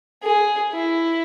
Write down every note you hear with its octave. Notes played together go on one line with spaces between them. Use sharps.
G#4
E4